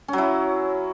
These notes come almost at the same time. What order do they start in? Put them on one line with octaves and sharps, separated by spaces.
C#4 F#3 E4